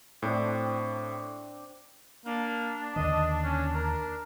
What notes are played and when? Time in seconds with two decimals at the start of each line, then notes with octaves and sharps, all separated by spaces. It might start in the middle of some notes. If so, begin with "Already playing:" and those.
0.22 A2 C4 D4
2.26 A#3 D4
2.96 D#2 D3 D#3 D#5
3.44 C#4
3.75 A#4